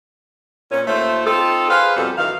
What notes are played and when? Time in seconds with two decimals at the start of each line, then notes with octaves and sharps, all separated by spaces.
0.71 A#2 C#4
0.87 D#2 A3 F4 A4 C5
1.26 C4 D#4 F4 A4
1.70 G#4 B4 C5 F5
1.97 F2 B2 G3 A4
2.18 F#2 D#3 E3 F5